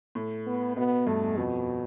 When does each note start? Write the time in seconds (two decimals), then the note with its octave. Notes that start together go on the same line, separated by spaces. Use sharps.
0.15 A2
0.46 B3
0.77 B2 B3
1.07 G2 A3
1.22 E2
1.37 F2 B2